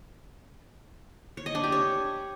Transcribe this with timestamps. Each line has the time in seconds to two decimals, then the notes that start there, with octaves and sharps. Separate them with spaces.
1.37 C#5
1.46 D#5
1.55 D4
1.64 G4
1.72 C#5